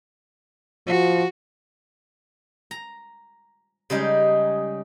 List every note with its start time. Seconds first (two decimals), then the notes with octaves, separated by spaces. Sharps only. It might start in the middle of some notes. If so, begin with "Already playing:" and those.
0.87 F3 F#4
2.71 A#5
3.90 C#3 G3 G#3 D#4